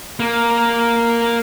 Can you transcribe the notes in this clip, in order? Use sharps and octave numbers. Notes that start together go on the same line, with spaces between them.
A#3